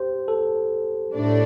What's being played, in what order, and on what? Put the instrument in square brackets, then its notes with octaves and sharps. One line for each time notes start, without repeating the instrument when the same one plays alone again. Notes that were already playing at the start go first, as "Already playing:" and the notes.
Already playing: [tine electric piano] G4 C5
A4
[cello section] A2 A3 D4 D5